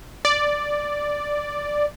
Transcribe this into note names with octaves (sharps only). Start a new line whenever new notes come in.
D5